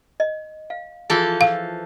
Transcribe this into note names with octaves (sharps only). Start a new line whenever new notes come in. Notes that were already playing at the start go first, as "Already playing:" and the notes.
D#5
F5
E3 F3 F4 G#4 A4 G#5
F5